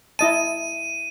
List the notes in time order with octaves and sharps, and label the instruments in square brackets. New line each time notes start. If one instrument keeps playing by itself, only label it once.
[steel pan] E4 D#5 A5 [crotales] D#7